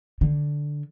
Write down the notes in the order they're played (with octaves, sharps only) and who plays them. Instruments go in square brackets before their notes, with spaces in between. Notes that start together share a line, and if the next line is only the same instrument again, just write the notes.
[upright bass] D3